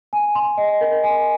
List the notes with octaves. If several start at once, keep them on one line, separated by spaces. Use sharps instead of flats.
G#5
C6
D#5
A#4
G#5